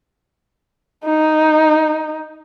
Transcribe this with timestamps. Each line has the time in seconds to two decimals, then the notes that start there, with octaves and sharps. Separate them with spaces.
1.05 D#4